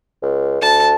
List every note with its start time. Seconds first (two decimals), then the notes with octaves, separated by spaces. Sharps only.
0.23 C#2
0.62 D2 A5